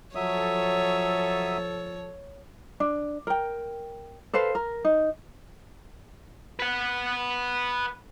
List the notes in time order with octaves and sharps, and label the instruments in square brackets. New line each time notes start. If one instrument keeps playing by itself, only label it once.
[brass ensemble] F3 A4 [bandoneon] F#3 E5 D#6 [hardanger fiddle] C#5
[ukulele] D4
A#4 G5
A4 B4 C5 F5
A#4
D#4
[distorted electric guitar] B4 F#5